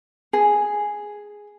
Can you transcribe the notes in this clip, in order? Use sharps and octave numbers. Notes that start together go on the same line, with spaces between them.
G#4